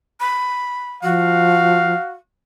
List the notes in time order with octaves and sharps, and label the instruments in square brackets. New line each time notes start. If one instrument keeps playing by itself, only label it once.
[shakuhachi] B5
[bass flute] F3 [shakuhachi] F#4 [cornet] F5